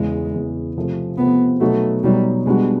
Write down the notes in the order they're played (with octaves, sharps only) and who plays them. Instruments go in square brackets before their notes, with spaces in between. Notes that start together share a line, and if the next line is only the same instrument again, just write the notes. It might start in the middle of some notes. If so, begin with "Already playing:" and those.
Already playing: [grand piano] E2 C#3 E3 [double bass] G#3
[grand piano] E2 C#3 E3
C3 F3 A3 C4
[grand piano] C3 F3 A3 C4 [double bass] B3
[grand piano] B2 F#3 B3 D#4 F#4 [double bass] A3
[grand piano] B2 F#3 B3 D#4 F#4 [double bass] G3
[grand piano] B2 G3 B3 D4 F#4 [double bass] G#3